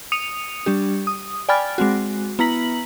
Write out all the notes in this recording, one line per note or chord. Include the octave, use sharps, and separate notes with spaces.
D#6 C#7 D#7 F7
G3 D4 G4
D#6
D5 G5 G#5 B5 F6 A6
G#3 C4 F#4
B3 E4 A#5 B6 F#7